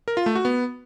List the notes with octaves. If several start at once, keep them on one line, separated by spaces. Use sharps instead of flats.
A#4
F4
A3
F#4
B3